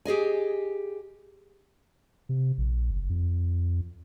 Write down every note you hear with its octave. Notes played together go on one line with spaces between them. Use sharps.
G4 G#4 D#5 G#5
C3
A#1
F#1
F2